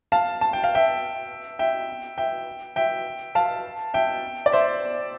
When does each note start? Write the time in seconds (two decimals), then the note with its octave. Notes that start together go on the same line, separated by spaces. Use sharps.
0.12 F5 A5
0.41 A5
0.53 G5
0.64 F5
0.75 E5 G5
1.59 E5 G5
2.18 E5 G5
2.76 E5 G5
3.35 F5 A5
3.94 E5 G5
4.46 D5
4.52 C5 E5